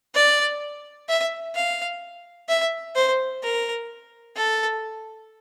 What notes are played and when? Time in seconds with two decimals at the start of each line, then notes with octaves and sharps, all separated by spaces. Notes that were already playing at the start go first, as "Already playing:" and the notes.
0.15 D5
1.09 E5
1.55 F5
2.49 E5
2.96 C5
3.43 A#4
4.36 A4